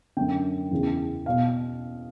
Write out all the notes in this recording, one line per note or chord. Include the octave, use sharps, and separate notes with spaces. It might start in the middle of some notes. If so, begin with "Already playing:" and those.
F#2 D3 G5
E2 C#3 E3
B2 F5